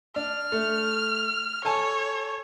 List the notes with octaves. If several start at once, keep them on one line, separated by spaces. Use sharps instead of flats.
D4 F6
A3
A4 C#5 G#5 A5